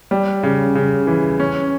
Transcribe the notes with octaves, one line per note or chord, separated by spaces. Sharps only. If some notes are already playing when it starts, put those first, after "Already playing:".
G3
C#3
C#3
E3
C#4